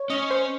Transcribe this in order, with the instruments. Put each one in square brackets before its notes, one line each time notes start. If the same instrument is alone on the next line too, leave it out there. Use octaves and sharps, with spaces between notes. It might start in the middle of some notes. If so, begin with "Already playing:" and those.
Already playing: [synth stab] C#5
[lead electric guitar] C#4 [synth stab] D#5
[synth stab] C5